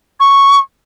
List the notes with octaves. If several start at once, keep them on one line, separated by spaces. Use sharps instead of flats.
C#6